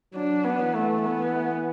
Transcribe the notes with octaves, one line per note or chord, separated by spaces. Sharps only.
F#3 D4
B3
E3
A3
B3